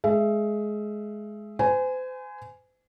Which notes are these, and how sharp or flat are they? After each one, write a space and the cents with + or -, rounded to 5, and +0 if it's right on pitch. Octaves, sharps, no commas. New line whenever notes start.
G#3 +20 E5 +25
C5 -40 G#5 +0